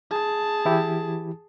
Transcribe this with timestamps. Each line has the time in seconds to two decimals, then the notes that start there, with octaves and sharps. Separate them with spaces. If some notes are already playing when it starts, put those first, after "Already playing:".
0.11 G#4 A5
0.65 E3 E4 G4